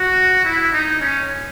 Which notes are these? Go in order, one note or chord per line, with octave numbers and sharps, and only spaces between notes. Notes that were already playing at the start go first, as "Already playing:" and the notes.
Already playing: F#4
E4
D#4
C#4